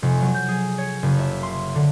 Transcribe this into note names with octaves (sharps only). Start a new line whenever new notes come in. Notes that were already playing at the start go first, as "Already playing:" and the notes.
F1
F#3
G6
G#4
C#5
F#1
E5
C6
D3